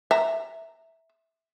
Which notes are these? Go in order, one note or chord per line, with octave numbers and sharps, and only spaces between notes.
E5 A#5